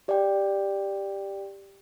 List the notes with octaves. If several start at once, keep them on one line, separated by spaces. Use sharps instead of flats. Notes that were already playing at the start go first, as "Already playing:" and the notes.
G4 D5 G5